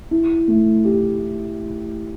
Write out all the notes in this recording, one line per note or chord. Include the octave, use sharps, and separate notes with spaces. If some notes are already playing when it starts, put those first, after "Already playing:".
E4
A3
G4